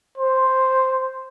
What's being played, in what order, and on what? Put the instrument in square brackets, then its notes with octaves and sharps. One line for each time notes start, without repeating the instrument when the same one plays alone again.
[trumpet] C5